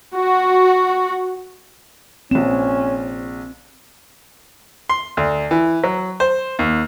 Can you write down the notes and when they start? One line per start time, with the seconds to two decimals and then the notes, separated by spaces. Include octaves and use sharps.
0.17 F#4
2.31 A#1 C4 C#4 E7
4.89 C6
5.17 D2
5.51 E3
5.84 F#3
6.20 C5
6.59 D#2